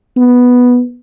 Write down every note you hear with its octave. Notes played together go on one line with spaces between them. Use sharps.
B3